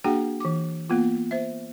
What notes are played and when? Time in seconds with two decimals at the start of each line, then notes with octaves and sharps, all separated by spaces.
0.04 A#3 D4 F#4 G#4 F#5 G5
0.40 E3 D6
0.90 A#3 B3 F4
1.31 C5 E5